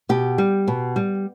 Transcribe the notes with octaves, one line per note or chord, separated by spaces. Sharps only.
B2 G4
G3
B2
G3